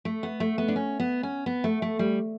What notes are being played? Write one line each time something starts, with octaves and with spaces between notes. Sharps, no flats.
A3
B3
A3
B3
D4
C#4
B3
C#4
B3
A3
A3
G3